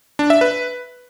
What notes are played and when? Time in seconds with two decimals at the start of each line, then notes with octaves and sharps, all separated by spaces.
0.19 D4
0.30 E5
0.41 B4